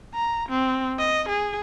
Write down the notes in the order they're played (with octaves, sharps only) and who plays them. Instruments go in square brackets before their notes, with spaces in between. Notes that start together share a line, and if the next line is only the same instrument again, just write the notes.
[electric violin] A#5
C4
D#5
G#4